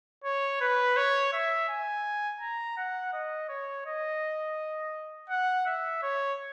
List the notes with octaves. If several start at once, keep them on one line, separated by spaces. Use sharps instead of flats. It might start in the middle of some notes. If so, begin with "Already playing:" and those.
C#5
B4
C#5
E5
G#5
A#5
F#5
D#5
C#5
D#5
F#5
E5
C#5